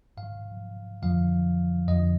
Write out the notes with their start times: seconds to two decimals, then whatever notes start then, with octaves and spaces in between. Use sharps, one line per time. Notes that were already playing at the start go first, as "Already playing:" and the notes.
0.17 G#2 F5
0.23 D#3
1.02 F2 D3 F3 F5
1.88 F2 D3 F3 D#5